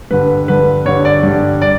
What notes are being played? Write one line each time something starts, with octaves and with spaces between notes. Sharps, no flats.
G2 D3 B4
G2 D3 B4
G2 D3 C#5
D5
G2 D3
D5